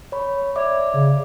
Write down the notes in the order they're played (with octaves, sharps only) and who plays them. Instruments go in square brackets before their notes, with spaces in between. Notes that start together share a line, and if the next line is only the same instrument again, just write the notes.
[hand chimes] C#5 B5
[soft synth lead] C#5 [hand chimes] D5 E5 D6
[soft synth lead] C#3